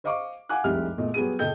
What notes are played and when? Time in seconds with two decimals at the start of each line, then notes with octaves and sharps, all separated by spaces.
0.04 C5 D#5 F5 C#6 D6
0.49 F5 F#5 G#5 D6 F#6
0.64 F1 C2 G#3 G4 E5 F6
0.98 E2 A#2 A3 D#5
1.14 F#3 G3 B3 G#4 D#7
1.39 A#2 C#3 A4 D#5 G5 G6